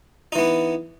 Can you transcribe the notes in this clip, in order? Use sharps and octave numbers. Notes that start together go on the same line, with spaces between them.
E3 B3 D#4